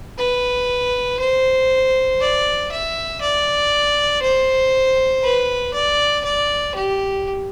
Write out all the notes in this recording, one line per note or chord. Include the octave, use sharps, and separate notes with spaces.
B4
C5
D5
E5
D5
C5
B4
D5
D5
G4